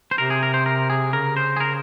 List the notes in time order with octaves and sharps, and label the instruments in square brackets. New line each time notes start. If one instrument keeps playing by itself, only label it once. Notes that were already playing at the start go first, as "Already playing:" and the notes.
[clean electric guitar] C5
[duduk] C3 [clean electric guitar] A#4
[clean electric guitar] G#4
A#4
C5
A#4
G#4
[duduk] C#3 [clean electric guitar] A#4
[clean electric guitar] C5
G#4
A#4